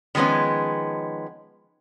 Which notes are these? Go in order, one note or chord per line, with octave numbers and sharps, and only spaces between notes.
D#3 F3 G#3 B3 C#4